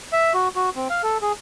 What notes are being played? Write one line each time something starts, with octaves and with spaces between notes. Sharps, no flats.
E5
F#4
F#4
C4
F5
A4
G#4